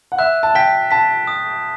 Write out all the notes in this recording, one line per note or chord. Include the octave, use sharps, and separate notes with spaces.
F#5
E5 F#6
A5
G5 B6
A5 B6
D#6